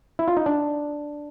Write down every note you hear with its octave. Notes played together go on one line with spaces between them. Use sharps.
E4
F4
D#4
D4